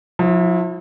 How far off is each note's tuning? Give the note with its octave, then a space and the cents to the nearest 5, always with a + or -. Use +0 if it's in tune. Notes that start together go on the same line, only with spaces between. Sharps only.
F3 +40 E4 -10